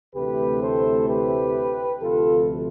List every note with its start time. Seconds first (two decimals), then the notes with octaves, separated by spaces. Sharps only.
0.15 D2 C3 E3 A3 G4 B4
0.61 A4 C5
1.08 G4 B4
2.01 D2 C3 F3 F4 A4